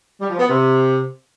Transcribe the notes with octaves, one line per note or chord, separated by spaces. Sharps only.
G3
F3
B3
C3